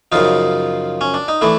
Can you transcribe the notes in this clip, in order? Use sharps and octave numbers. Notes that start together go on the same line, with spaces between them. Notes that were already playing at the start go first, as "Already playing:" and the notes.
F#2 C#3 F3 D#4 F4
C#4
D4
D#4
E3 A3 D4 E4